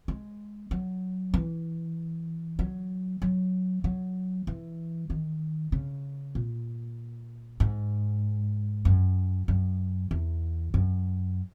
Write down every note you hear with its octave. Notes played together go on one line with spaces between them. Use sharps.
G#3
F#3
E3
F#3
F#3
F#3
E3
D#3
C#3
A#2
G#2
F#2
F#2
E2
F#2